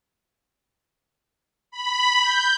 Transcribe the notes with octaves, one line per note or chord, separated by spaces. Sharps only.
B5
G6